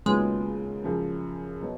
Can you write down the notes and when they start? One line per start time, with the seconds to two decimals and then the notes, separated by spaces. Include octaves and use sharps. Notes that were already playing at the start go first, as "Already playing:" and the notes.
0.06 D#2 C#3 F#3 G#3 B3 F4
0.84 F#2 C#3 F3
1.62 B2 F#3